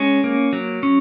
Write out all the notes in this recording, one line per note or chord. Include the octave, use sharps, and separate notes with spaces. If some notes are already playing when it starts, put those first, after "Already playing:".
Already playing: G#3 C#4
A#3
F#3
C#4